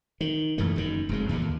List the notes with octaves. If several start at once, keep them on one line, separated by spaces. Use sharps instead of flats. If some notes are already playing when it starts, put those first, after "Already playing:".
D#3
A#1 F#2 E3 A3
F#1 F#2 A#2 D#3
F1 F#2 G#3
E2 G2 A#2 D3
D#2